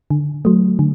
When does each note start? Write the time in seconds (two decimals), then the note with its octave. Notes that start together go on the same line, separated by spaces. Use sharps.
0.10 D3
0.45 F#3 A3
0.79 D3